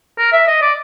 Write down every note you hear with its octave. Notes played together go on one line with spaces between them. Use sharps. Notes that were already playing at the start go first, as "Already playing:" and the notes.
A#4
E5
D#5
D5